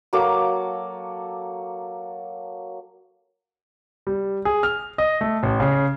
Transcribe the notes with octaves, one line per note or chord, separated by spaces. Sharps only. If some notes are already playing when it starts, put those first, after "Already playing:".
F#3 A#3 A4 D6
G3
G#4
F6
D#5
A3
A1
C#3